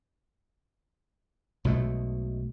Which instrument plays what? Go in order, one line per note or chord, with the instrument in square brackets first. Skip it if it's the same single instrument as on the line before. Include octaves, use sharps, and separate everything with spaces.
[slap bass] B1 B2 G#3 A3